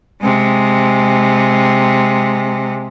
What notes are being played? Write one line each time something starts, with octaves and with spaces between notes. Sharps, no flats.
C3 G#3